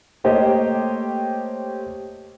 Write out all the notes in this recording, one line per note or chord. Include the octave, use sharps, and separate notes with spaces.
A3 A#3 G4 C5 C#5 D#5